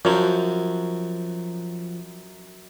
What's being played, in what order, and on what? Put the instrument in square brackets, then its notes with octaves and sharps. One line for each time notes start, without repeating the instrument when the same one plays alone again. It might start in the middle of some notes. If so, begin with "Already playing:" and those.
[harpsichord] F#2 F#3 [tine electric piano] F3